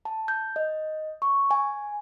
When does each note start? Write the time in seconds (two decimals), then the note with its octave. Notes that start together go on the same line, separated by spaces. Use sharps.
0.05 A5
0.28 G6
0.56 D#5
1.22 C#6
1.51 G#5